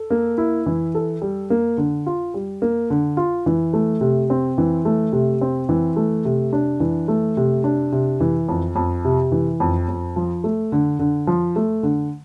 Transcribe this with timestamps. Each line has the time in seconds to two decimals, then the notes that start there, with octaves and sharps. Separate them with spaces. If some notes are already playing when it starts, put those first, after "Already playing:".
Already playing: A4
0.10 A#3
0.38 E4
0.66 E3
0.95 A4
1.22 G3
1.50 A#3
1.78 D3
2.06 F4
2.34 G3
2.62 A#3
2.90 D3
3.17 F4
3.46 E3
3.73 A3
4.01 C3
4.30 C4
4.58 E3
4.85 A3
5.13 C3
5.41 C4
5.69 E3
5.96 A3
6.25 C3
6.53 D4
6.80 E3
7.08 A3
7.37 C3
7.64 D4
7.92 C3
8.20 E3
8.49 F2
8.76 F2
9.05 C3
9.32 E3
9.60 F2
9.88 F2
10.16 F3
10.44 A3
10.72 D3
10.99 D3
11.27 F3
11.56 A3
11.83 D3